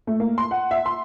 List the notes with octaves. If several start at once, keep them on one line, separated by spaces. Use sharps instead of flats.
A3
A#3
C6
F#5
E5
C6